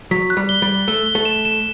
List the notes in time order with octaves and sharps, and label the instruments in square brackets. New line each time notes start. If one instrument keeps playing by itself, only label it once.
[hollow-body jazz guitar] F#3 [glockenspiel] B6
[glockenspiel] F#6
[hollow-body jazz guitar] G3
[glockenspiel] G7
[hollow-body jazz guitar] G3
[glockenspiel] G7
[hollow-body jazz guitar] A3 [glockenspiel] G7
[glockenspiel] G7
[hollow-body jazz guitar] A3
[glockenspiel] E7
E7